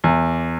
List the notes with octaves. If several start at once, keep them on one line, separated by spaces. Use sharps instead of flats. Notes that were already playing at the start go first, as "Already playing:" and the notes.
E2